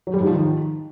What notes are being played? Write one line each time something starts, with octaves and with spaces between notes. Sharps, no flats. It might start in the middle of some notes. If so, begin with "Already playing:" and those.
F#3
G3
G#2
F3
D#3